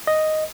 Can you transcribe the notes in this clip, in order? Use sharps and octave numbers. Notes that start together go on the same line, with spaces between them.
D#5